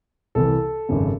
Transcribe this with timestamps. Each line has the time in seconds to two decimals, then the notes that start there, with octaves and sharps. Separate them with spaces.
0.35 C2 C3 E3 A4
0.89 G#1 F#2 C#3